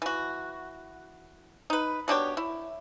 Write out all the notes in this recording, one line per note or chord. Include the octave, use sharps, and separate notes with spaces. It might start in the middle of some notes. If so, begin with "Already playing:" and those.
E3 F#4
D#4 B4
B2 D4 G4 C#5
E4